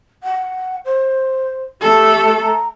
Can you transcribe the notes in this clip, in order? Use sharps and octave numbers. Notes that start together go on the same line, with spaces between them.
F#5
C5
A3 G4 A4
A#5